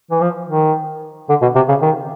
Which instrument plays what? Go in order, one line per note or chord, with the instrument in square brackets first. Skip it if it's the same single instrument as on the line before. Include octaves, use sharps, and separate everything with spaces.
[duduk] E3
F3
D#3
D3
B2
C3
C#3
D#3